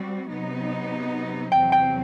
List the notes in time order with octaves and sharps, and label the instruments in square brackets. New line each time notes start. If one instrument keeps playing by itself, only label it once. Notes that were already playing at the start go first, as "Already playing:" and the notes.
Already playing: [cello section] G3 C4 F#4
C3 F#3 B3 D#4
[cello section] E2 C3 F#3 C4 [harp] G5
[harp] G5